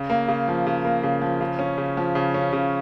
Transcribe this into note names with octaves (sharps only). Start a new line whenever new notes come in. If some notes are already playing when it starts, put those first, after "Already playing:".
Already playing: C#3
A#3
C#3
F3
C#3
A#3
C#3
F3
C#3
C#4
C#3
F3
C#3
C#4
C#3